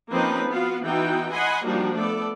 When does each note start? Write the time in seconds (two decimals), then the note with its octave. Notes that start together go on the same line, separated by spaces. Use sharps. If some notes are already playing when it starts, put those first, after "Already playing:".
0.12 F3 A#3 C4 C#4 D#4 B4
0.50 B3 F4 F#4 F5
0.83 E3 B3 D#4 F#4 G5
1.31 D#5 F#5 G#5 B5 C6
1.65 F3 G3 A#3 D4 D#4 F#4
1.96 A3 B3 A4 D5